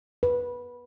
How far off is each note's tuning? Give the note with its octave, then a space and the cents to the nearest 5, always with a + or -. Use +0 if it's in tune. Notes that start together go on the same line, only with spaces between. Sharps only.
B4 -20